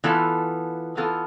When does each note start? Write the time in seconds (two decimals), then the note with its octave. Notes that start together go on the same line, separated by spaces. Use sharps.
0.04 E3 B3 F4 A4
0.97 E3 B3 F4 A4